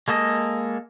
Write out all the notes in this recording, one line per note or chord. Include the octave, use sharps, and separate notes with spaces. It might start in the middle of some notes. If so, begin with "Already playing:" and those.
G#3 A#3 A4 D#5